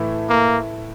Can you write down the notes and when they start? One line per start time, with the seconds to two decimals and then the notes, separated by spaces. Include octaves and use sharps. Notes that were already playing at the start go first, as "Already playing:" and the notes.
Already playing: A2 E3 A3 E4
0.29 A#3